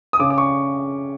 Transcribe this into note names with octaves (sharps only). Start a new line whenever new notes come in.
D#6
C#3 D6
D6
C#6